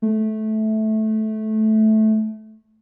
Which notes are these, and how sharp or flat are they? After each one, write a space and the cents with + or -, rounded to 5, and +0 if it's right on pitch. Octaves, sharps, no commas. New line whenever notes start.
A3 -15